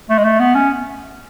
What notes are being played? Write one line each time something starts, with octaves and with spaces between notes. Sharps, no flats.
A3
G#3
A3
B3
C#4